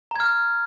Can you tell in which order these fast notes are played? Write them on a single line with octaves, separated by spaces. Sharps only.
A#5 G#6 F6